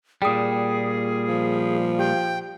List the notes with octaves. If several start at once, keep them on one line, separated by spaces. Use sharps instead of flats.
A#2 G3 G#4 G5 D#6
F3
G4 G5